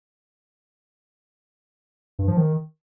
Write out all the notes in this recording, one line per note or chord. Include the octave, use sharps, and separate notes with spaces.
G2
F3
D#3